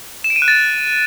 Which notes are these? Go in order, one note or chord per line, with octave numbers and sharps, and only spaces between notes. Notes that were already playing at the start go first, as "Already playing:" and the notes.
E7
D7
D#7
F#6
A6